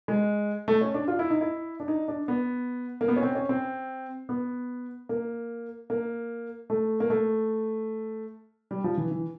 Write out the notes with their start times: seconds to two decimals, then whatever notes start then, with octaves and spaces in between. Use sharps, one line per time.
0.08 G#3
0.68 A3
0.81 C#4
0.94 D4
1.08 F4
1.19 E4
1.30 D#4
1.41 E4
1.80 D4
1.88 D#4
2.08 D4
2.28 B3
3.01 A#3
3.08 B3
3.16 C#4
3.23 C4
3.35 C#4
3.49 C4
4.29 B3
5.09 A#3
5.90 A#3
6.70 A3
7.00 A#3
7.10 A3
8.71 G3
8.84 F3
8.97 E3
9.11 E3